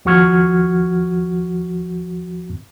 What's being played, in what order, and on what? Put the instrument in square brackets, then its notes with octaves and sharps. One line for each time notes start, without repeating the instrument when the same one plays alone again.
[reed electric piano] D#2 F3 F#4 C#6 F6 G#6